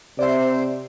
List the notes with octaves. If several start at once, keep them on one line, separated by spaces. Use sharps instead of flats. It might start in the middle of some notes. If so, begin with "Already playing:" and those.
C3 C5 D5 E5